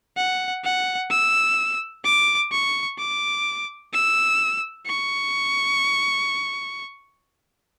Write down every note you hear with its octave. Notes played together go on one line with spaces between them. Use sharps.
F#5
F#5
E6
D6
C#6
D6
E6
C#6